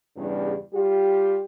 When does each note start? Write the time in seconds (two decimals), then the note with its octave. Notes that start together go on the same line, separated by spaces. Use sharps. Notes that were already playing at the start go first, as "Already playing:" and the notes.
0.16 E2 G2 C#3 G3
0.74 G3 F4 G4